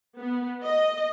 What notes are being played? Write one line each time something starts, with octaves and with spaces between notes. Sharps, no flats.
B3
D#5